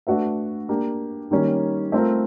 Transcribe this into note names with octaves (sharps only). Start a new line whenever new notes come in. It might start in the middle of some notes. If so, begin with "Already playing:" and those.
A3 D4 F#4 B4 E5
A#3 D4 G4
D#3 G3 A#3 C#4
A3 C4 F4 A#4